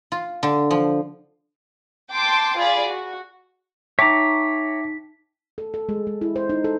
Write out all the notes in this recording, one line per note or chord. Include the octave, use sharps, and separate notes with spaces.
F4
D3
F3
G5 A5 C6 D6
F4 G#4 D5 B5
F#4
D#4 C#5 E5 G5 A5 A#5 D6 B6
A4
A4
G#3
G#3
E4
C5
D#4
A4